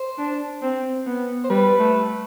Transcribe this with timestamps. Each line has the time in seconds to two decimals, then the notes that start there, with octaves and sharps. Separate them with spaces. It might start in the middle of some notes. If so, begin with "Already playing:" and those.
Already playing: C5
0.18 D4
0.62 C4
1.06 B3
1.44 C5
1.50 G3 B4
1.79 A3